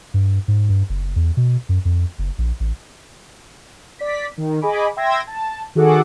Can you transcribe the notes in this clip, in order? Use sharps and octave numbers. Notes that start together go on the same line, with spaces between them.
G2
G#2
G2
F#1
E2
B2
F#2
F2
F#1
A#1
A1
D5 B6
D#3
G#4 D#5 G#5 B5 D6
E5 G5 C6 E6 G#6 A#6
A5
D#3 F#4 G#4 A4 F#5 D6